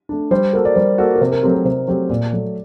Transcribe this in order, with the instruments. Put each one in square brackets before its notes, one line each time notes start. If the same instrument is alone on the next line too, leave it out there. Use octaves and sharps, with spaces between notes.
[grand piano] A3 D4
[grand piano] G3 [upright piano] C5
[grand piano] A#3 F#4 A4 [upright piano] A#4
[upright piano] D5
[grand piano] G3 [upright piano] C5
[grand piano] A#3 F#4 A4
[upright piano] A#4
[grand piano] C3 [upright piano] C5
[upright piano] A#4
[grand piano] F#3 A3 C4 G4 [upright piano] C5
[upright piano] A#4
[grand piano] C3 [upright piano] C5
[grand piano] F#3 A3 C4 G4 [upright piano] C5
[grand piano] A#2 [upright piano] D5
[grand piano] F#3 A3